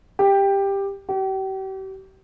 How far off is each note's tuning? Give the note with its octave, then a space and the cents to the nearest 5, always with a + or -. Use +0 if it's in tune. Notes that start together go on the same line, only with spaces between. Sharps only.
G4 +10
G4 -40